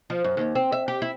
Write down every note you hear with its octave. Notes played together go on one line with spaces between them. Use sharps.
F3
F#2
D#2
C4
E5
G4
E4